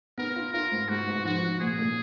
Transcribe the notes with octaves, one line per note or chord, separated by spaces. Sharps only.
B3 A#4
F4
F4 A#4
G#2
G#2 F#4
G#2
F3 F#4
F3
A#2 G#4
A#2